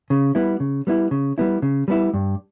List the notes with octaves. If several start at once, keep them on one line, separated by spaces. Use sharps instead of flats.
C#3
G3 B3 E4
C#3
G3 B3 E4
C#3
G3 B3 E4
C#3
G3 B3 E4
G2